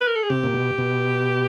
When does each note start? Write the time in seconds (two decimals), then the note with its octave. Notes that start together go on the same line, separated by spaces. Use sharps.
0.01 B4
0.07 A#4
0.15 A4
0.23 G#4
0.30 C3 G4
0.43 A#2
0.54 B2
0.78 B2